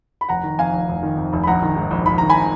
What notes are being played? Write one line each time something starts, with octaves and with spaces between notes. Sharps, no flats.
B5
F1 F#5 A#5
D#3
F2 F5 G#5
F1
F1
D#3
F2
F1
B5
A#1 F#5 A#5
D#3
G#2
A#1
A#1 B5
D#3 A#5
G#5 B5